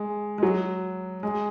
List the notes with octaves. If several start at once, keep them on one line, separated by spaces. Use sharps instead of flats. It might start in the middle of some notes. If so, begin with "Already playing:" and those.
Already playing: G#3
G#3
F#3
G#3